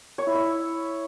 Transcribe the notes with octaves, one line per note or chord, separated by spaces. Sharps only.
C#5
E4
E5